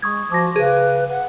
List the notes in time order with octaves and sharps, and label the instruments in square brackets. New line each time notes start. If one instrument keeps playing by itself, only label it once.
[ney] G#3 [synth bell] C#6 D#6 G#6
[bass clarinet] F3 [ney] F#4 [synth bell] D6 A#6
[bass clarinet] C#3 [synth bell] G#4 [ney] B4
[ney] F#5